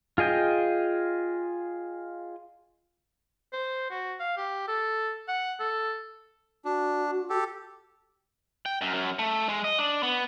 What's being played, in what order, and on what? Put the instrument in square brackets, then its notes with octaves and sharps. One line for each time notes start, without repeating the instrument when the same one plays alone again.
[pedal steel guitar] F4 G#4 D#5 G5
[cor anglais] C5
F#4
F5
G4
A4
F#5
A4
[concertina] D4 [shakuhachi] F#4
[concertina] G4 A4
[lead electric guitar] G5
F#2
F#2
A3
G#3
D#5
D4
B3